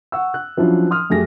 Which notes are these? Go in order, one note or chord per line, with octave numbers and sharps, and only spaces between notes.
F#5 C#6 E6
F#6
F3 F#3 C#4 D4 E4 F4
C6 D#6 F6
F#2 A3 G4 G#4 A#6